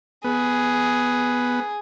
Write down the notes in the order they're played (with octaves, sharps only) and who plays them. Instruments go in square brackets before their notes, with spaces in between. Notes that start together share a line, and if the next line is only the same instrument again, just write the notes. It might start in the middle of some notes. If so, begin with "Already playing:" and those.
[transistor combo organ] B3 [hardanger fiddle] G#4